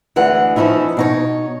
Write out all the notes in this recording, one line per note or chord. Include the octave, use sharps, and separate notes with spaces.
D2 E3 G#3 F#5
E3 F3 C#4 D#4 E4
B2 D#4 C#5